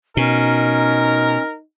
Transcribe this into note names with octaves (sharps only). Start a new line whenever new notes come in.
B2 C#4 D#4 A#4